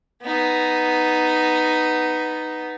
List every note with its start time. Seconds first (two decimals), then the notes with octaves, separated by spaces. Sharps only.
0.23 B3 D#4